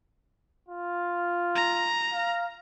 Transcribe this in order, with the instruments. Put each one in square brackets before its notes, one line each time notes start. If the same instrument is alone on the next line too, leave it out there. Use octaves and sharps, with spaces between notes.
[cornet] F4
[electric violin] A#5
[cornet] F5